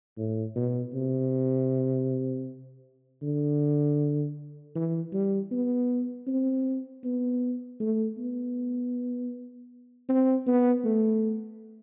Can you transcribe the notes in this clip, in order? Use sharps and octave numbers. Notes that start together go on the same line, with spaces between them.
A2
B2
C3
D3
E3
G3
B3
C4
B3
A3
B3
C4
B3
A3